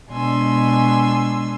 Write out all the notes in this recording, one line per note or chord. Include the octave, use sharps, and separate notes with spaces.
B2 G#3 D4 G#5 C6 E6